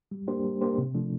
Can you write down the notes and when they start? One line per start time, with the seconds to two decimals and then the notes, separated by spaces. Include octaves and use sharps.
0.11 G3
0.28 A#3 D4 G4 C5
0.44 G3
0.61 A#3 D4 G4 C5
0.78 C3
0.94 F3 A3 D4